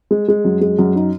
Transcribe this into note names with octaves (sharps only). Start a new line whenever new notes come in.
G#3
G#3
F#2
G#3
F#2
D#4